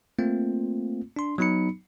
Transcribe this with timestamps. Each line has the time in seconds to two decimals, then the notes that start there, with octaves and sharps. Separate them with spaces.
0.19 A3 A#3 C4 F4
1.16 D4 C6
1.38 F#3 B3 D#4 B5 C#7